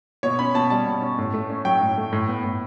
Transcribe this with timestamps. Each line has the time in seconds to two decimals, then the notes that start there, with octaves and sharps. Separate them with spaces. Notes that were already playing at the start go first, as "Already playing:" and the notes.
0.23 B2 C#5
0.39 C#4 B5
0.54 B2 A5
0.70 G3 A5
0.86 B2
1.02 C#4
1.18 A2
1.33 A3
1.50 C#4
1.65 F#3 G5
1.81 A2
1.98 A3
2.12 A2
2.29 B3
2.44 A2